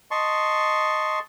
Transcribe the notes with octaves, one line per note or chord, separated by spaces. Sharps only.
D#5 A5 C6 C#6